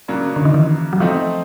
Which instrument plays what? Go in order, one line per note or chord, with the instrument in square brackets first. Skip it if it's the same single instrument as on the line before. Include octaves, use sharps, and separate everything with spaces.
[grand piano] C#3 F#3 A#3 D4
[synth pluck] D3
D#3
E3
F#3
[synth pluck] F3 [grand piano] A3 C4 D#4